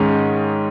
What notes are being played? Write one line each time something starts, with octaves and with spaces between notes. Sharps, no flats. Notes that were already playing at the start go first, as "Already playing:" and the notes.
Already playing: G#2 D#3 G#3 C#4